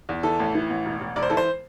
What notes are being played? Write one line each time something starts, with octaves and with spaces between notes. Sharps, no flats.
E2
E3 A4
A1
E3
A1
E1
E1
E1 D5
C5
E3 A4
C5